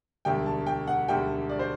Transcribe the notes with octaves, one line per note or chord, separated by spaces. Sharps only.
E1 D2 D3 G3 G5
A5
G5
F#5
E1 D2 D3 G3 G5
D5
C5